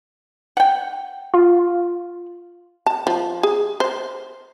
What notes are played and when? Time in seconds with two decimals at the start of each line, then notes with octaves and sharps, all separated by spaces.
0.57 F#5 G5
1.34 F4
2.86 A5
3.07 F3
3.43 G#4
3.80 C5